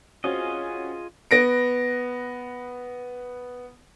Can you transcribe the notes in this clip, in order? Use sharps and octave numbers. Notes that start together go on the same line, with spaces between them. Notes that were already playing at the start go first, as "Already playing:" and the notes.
C4 C#4 F4 F#4 G#4 D#5
B3 A#6 D7